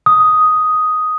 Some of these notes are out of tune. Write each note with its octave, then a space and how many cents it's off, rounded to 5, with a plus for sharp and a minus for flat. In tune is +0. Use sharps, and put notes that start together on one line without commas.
D#6 +5